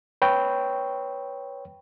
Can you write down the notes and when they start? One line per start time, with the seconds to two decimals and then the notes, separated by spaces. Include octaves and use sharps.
0.22 B4 C#5 G5